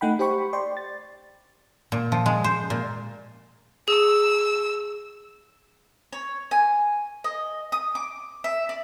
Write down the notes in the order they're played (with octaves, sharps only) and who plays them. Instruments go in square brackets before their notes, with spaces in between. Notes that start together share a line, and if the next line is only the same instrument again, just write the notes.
[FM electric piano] A3 D#4 F#5 G5 B5
G4 C5 G5 B5 C#6
D5 G5 C6
A6
[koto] A#2
F3
G#3
C5
A#2
[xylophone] G#4 [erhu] E6
[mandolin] C#5
G#5
D#5
D#6
D6
E5
D5